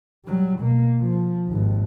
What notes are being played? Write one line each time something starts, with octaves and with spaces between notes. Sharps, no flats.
F#3 G3
B2 A#3
F3
G#1 D#2